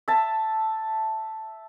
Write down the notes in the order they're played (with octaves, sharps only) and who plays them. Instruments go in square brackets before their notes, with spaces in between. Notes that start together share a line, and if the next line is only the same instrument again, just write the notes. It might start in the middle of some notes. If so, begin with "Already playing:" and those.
[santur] E5 A5